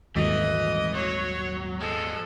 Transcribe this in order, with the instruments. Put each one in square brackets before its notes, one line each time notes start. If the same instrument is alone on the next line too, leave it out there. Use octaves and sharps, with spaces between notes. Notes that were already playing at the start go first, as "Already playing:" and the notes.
[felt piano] D#1 G#1 B6 [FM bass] D#2 [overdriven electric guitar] E3 [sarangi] D#5
[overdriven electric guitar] F#3 [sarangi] C#5
[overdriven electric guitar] F3 G#3 [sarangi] A4